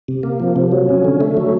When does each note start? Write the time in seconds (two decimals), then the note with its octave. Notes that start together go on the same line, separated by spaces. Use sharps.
0.08 C3
0.23 A#3
0.40 F3
0.56 C3
0.72 F#3
0.89 C#4
1.05 D3
1.21 A3
1.37 F#3